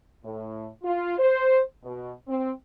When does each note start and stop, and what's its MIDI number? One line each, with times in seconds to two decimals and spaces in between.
0.23 0.67 45
0.83 1.15 65
1.18 1.60 72
1.83 2.10 47
2.27 2.51 60